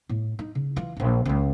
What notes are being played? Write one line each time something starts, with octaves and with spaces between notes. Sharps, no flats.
A2
D#4
C#3
E3 F4
E1 A#1
C#2 C#4